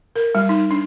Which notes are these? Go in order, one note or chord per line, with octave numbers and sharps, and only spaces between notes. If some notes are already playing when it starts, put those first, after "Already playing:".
A#4
G3
D#4
D4